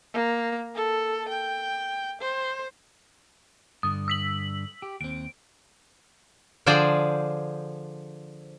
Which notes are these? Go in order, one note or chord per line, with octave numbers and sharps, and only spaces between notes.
A#3
A4
G5
C5
G2 D3 D#6
E6 B6 F#7
G4
D#2 C4 D7
D3 F3 G#4 C5 D5 G5